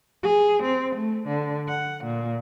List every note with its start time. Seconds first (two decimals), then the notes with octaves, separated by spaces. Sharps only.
0.23 G#4
0.64 C4
0.96 A3
1.27 D3
1.69 F#5
2.05 A#2